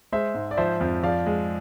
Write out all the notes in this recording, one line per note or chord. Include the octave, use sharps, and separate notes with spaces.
G#3 C5 E5
G#2
D5
F3 C5 E5
F2
F3 D5 F5
G#3